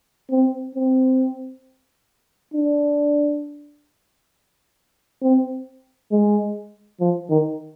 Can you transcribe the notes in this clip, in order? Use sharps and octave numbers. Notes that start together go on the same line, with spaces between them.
C4
C4
D4
C4
G#3
F3
D#3